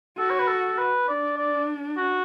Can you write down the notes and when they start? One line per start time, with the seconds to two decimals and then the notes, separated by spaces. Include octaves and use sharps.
0.18 F#4 A4
0.30 C#5
0.39 B4
0.48 A4
0.78 B4
1.08 D4 D5
1.38 D5
1.97 F#4